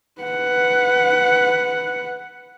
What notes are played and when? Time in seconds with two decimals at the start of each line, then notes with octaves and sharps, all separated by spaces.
0.22 B4 F#5